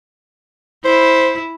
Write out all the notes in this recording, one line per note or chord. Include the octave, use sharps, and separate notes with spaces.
E4 C5